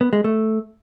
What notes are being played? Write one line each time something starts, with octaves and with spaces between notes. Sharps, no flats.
B3
G#3
A3